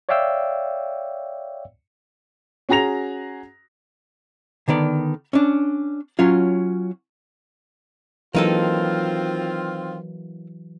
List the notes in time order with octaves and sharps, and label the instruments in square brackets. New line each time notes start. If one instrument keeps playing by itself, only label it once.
[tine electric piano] C#5 D5 E5 F5 G5 E6
[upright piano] C#4 F#4 G#4 A#5 A#6 F7
[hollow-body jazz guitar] D3 D#3 B3 D5
C#4 D4
F#3 C#4 F4
[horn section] D#3 C4 F4 [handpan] E3 F#3 [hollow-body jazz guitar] A#3 D#4 A4